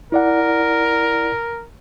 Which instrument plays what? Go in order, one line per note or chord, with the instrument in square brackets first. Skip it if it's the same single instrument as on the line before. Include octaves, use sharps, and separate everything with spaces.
[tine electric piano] E4 D5 F#5 [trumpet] A#4